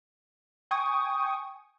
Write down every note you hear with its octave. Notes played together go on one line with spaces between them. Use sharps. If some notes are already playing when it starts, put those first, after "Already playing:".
G5 G#5 C#6 D#6